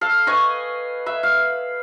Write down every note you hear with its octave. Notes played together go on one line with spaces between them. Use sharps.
A4 F5
B4 D#5 G#5 C#6
B4 E5
F5